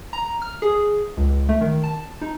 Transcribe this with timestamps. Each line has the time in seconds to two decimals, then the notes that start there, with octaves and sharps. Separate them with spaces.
0.13 A#5
0.42 F6
0.62 G#4
1.17 C#2
1.49 A3
1.61 D#3
1.84 A5
2.21 D#4